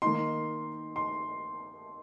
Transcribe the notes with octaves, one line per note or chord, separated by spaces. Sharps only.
D#3 A#3 D#4 C6
C6